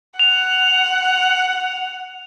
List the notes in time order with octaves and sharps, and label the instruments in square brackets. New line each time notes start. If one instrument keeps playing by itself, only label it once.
[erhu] F#5 [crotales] F7